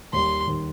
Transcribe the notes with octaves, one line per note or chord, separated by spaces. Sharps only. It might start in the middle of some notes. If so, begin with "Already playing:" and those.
D#2 D#3 G3 C6
D#2 D#3 G3